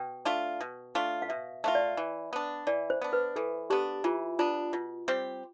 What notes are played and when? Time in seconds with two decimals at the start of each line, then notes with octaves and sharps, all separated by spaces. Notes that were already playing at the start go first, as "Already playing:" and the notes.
Already playing: B2 G5
0.25 A3 D4 F4
0.61 B2
0.95 A3 D4 F4
1.22 F5
1.29 B2 E5
1.64 A3 D4 F4 E5
1.75 D5
1.97 E3
2.33 B3 D4
2.67 E3 D5
2.90 C5
3.01 B3 D4
3.13 B4
3.36 E3 A4
3.70 B3 D4 G4
4.04 E3 F4
4.39 B3 D4 F4
4.73 B2 F4
5.08 G3 C4 G4